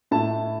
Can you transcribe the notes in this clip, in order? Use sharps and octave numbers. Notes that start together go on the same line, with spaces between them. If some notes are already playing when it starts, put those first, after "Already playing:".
A2 A3 E4 A5